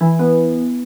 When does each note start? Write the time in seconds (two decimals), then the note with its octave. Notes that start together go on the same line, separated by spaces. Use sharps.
0.01 E3
0.19 B3